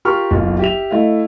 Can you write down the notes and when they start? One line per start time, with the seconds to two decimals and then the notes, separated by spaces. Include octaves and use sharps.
0.05 F4 G4 A#4 C6 C#6 F6
0.31 F#1 B1 F4
0.59 G4 E5 F7
0.91 A3 E4 D#5 F5